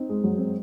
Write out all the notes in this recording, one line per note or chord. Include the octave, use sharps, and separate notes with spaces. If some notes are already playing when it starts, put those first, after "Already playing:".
Already playing: C4 D#4
G#3
F#3
C4